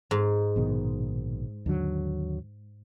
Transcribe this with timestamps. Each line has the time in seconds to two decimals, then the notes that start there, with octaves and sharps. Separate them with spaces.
0.11 G#2
0.56 A#1 B2 D#3
1.66 D#2 D3 F#3